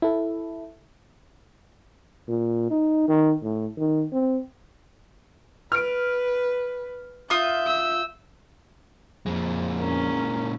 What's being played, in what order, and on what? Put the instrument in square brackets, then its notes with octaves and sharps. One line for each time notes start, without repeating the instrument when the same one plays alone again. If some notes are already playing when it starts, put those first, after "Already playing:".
[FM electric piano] E4 A4
[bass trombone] A#2
D#4
D#3
A2
D#3
C4
[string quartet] B4 [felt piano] F6 D7
[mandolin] F4 D#6 [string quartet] E5 G6
[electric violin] E6
[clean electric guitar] F2 [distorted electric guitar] A#2 G#3
[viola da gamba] C#4 [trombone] A#4